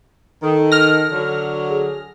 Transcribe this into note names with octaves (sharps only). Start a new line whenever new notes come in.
D#3 A4
F6 A#6
D3 F#3
G#4